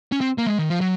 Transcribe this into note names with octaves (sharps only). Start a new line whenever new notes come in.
C#4
C4
A#3
G#3
D#3
F3
F#3